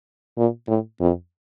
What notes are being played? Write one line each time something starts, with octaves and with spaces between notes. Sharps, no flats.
A#2
A2
F2